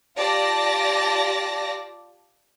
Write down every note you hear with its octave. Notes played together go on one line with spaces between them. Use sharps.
F4 G4 D5 A5 A#6